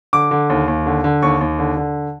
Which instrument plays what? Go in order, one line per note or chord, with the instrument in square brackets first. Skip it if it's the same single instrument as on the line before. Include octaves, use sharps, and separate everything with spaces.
[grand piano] D3 D6
D3
D#2
D#2
D3
D3
D#2 C#6
D#2
D3
D3